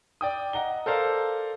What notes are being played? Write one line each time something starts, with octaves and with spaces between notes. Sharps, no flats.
D5 G5 D#6
D#5 F#5 A#5 G7
A4 A#4 C5 D5 F5 A#5